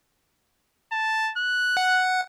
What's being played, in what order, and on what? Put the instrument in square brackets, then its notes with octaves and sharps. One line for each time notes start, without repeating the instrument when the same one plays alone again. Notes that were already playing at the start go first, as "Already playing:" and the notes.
[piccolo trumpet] A5
F#6
[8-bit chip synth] F#5